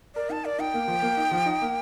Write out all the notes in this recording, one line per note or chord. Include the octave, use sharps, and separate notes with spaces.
A#4 D5
D#4 A5
A#4 D5
D#4 G5
A#3
F3
A#3
D#4
F3
D#4
A#3